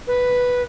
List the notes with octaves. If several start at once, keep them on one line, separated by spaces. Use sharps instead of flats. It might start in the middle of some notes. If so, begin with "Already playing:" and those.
B4